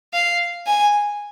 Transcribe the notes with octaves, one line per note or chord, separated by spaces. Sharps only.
F5
G#5